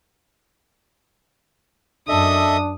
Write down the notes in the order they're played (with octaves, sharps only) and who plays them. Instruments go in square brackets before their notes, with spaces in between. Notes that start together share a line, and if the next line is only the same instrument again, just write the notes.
[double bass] F#2 [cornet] D4 [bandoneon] A4 D#5 E5 [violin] D#6